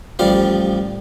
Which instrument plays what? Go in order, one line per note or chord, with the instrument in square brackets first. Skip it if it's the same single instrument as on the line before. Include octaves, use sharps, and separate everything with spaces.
[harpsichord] A1 F3 G3 F5